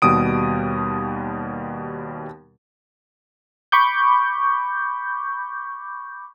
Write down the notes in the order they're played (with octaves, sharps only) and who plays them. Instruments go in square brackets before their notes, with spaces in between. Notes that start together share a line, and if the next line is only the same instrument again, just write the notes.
[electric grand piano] D#2 B2 G3 D#6 D7
[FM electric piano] B5 C#6 D6 G6